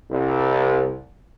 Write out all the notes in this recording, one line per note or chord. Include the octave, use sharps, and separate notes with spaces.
C2